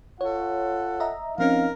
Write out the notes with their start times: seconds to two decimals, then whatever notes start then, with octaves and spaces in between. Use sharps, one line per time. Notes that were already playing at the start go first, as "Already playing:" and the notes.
0.21 F4 A4 C#5 F#5
1.00 D#5 E5 A#5
1.38 F3 C4 C#4 D#4 A#4 F5